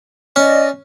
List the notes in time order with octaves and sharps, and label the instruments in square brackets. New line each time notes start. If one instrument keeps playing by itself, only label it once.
[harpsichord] C#4 [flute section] D5 D#5